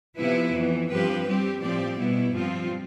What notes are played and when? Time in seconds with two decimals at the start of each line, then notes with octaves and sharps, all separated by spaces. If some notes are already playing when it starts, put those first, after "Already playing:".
0.18 C3 F3 B3 E4 B4
0.55 F2 E3 B3
0.90 G2 F3 C4 G4 B4
1.25 G3 C4 G4
1.61 A2 F3 C4 G4 D5
1.96 B2 G3 B3 E4
2.33 G2 F3 C4 F4